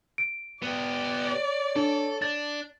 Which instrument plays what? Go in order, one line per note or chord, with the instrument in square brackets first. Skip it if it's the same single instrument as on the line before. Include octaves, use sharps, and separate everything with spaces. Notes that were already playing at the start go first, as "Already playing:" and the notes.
[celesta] D7
[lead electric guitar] B3 G4 [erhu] D5
[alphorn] C#5
[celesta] D4 [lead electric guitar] A4
[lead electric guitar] D4 [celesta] A6